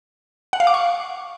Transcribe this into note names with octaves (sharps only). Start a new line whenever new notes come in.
F#5
F5
D6
C#6